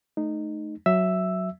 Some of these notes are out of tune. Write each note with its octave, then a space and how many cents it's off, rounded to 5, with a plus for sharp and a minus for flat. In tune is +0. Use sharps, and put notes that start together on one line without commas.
A3 -20 D#4 -15
F#3 +0 E5 +0 E6 +0